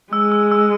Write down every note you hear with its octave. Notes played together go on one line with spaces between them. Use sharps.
G#3 E6
E6
E6